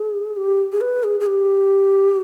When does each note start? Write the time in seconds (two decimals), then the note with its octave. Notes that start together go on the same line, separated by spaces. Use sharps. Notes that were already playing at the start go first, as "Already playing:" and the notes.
Already playing: G#4
0.37 G4
0.72 G#4
0.81 B4
1.04 G#4
1.20 G#4
1.26 G4